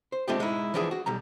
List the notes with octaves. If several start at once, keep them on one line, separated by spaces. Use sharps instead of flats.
C5
G#3 A3 C4 D4 F4 G4
G#3 D#4 E4
E3 F3 B3 D4 E4 G#4
F#4
B1 G3 A#5